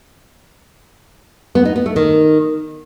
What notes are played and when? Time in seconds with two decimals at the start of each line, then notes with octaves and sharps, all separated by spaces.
1.55 B3
1.65 D#4
1.76 B3
1.86 A3
1.96 D#3